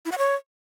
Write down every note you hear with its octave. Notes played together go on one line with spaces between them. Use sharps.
E4
F#5
C#5